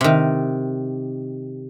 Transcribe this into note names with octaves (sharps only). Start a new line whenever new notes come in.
C3 D#3